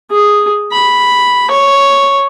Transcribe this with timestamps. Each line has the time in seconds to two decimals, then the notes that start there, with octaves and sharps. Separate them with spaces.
0.11 G#4
0.72 B5
1.51 C#5